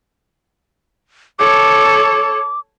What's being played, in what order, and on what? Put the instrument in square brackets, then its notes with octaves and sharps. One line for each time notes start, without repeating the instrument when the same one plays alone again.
[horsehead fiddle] A4 C#5 [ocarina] D6